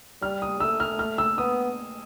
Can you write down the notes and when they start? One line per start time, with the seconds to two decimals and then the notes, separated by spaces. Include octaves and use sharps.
0.22 G3 F6
0.42 D#6
0.60 A3 E6
0.80 F6
0.99 F6
1.18 E6
1.38 B3 D#6